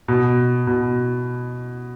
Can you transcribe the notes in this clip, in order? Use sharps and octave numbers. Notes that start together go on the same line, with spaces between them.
B2
B2